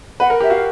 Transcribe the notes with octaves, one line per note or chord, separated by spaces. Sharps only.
B4 F#5
A#4
G4
E5
F#4 F5